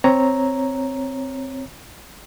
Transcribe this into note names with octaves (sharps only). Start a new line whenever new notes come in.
C4 C#5 A#5